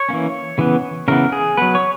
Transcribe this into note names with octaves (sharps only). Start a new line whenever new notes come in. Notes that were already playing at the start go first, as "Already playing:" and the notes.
Already playing: C#5
E3 A#3 C#4
C#3 E3 B3
C#3 E3 B3 A#4
G#4
F#3 B3 B4
C#5